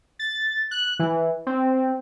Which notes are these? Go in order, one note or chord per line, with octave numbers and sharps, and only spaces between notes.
A6
F#6
E3
C4